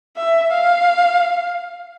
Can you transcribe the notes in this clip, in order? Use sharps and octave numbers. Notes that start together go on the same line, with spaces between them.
E5
F5